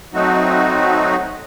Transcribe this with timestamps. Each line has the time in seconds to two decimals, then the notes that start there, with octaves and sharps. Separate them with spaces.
0.14 F#3 A3 C4 D#4 F#4